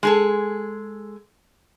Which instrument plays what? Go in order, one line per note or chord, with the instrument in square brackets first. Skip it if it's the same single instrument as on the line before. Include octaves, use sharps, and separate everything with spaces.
[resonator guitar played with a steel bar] G#3 G#4 A4